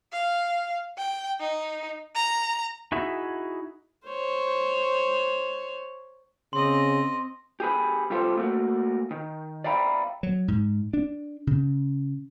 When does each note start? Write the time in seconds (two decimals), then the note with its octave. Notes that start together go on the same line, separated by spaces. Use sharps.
0.13 F5
0.98 G5
1.40 D#4
2.15 A#5
2.92 D#4 E4 F#4 G#4 E5
4.08 C5 C#5
6.53 C#3 C4 D#5 C6
7.60 G4 G#4 B4
8.10 C3 G3 F4 G4 A4 C5
8.37 A3 A#3 F#4
9.11 D#3
9.64 D5 E5 F5 G5 A#5 B5
10.23 F#3
10.48 G#2
10.93 D4
11.47 C#3